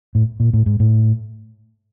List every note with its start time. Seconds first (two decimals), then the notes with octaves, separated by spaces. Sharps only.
0.15 A2
0.40 A#2
0.53 A2
0.66 G#2
0.80 A2